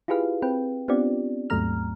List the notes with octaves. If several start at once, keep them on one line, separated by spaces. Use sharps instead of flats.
E4 F4 G4 G#4 B4 F5
C4 B4 G5
B3 C4 D4 F4 G4 D5
D#2 G#2 F#3 A3 A#5 F6